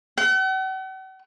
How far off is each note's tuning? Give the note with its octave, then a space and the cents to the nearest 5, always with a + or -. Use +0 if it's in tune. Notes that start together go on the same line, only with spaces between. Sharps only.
F#5 +45